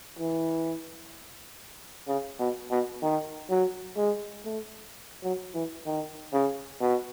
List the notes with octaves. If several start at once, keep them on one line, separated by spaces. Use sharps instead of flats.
E3
C#3
B2
B2
D#3
F#3
G#3
A3
F#3
E3
D#3
C#3
B2